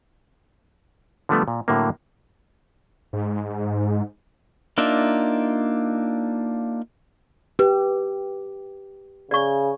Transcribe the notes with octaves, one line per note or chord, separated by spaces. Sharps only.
D3 F3 G3 A3 B3
A#2
A2 D3 F#3 A#3
G#2
A#3 D4 D#4 F4 E5
G4 B4
C#3 D5 C#6